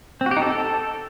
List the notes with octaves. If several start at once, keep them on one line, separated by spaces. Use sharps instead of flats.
C4
F#4
G4
D#4
A4